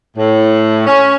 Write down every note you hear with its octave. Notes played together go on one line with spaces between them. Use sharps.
A2
C#4